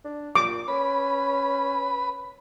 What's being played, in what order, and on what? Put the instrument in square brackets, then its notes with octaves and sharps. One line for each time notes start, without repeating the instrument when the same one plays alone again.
[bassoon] D4
[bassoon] A#2 [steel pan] D6
[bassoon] C#4 [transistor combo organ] B4 B5